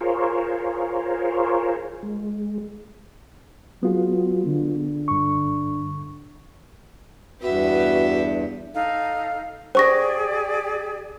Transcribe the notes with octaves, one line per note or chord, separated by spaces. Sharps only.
F4 G#4 A#4 C5 C#5
G#3
F#3 B3 F4 G#4
D3
G2 C#6
E2 G2 B3 F#4 G4 B4 E5
D#4 A4 F5
G4 G#4 C5 D5 C#6 A#6